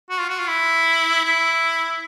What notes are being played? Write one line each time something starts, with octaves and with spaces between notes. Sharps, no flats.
F#4
F4
F#4
F4
E4
E4